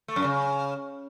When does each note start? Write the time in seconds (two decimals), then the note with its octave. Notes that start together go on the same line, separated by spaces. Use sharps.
0.08 A3
0.16 F#2
0.24 C#3